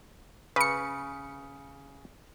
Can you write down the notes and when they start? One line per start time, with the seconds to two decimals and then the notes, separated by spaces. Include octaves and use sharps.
0.56 C#3 B4 C#7